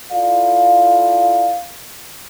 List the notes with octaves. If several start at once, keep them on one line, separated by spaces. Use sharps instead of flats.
E4 F4 A4 D5 F5